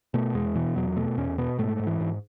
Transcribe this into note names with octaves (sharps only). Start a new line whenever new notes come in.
B2 A3
E2 G#3
B2 E3
E2 F#3
B2 A3
E2 C#4
B2 B3
G#2 A3
G#2
E3
G#2